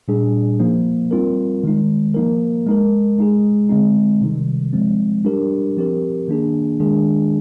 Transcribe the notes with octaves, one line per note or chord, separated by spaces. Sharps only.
A#2 G3 D4 G#4
F3 A#3 D#4
G3 C4 F4 A#4
D#3 G#3 D#4
F3 A#3 D#4 A#4
G#3 D#4 A#4
G#3 D#4 G#4
D3 G#3 C4 D#4
C3 D#3 G3
F3 G#3 C4
G3 D4 G4 A#4
F3 C4 G4 A#4
D#3 A#3 D4 G#4
D#3 G#3 D4 G#4